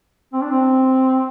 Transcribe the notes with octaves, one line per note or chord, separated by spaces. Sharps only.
C4
D4
C4